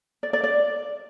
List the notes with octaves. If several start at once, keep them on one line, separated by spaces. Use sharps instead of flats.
D5
D5
D5